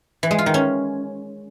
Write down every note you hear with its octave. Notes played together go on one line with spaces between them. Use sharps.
E3
G#3
F4
D#3
C#4